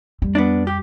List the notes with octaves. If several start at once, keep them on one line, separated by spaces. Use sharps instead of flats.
F2 G3
B3 D4
G4